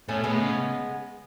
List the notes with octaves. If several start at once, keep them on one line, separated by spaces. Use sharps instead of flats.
A2 A3 C#4
A2 G#3 B3
C#3